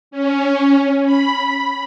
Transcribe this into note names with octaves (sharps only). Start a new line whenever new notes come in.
C#4
B5